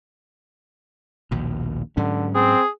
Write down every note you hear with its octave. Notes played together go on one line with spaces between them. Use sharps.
A#1 D#2 B2
G#2 D3 F#3 C#4
C4 G#4